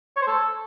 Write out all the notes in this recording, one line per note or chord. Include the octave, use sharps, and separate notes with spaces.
C#5
C5
A4